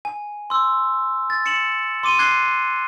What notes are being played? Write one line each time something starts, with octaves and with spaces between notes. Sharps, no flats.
G#5
C6 E6
A6
C#7 E7 F#7
C6 D6 D#7 G7
D6 F#6 G#6 C7 G7